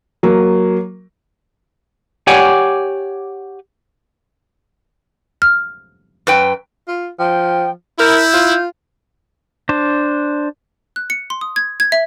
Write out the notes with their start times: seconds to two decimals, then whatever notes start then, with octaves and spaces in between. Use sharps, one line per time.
0.23 F#3 A#3
2.27 G4 C#5 D5 F#5 G#5
5.42 F6
6.27 F#2 B4 G5
6.87 F4
7.19 F3 G5
7.99 E4 A#4 G6
8.34 F4
9.69 D4 C5
10.96 F#6
11.10 C#7
11.30 C6
11.41 D#6
11.56 G#6
11.80 G#6
11.92 E5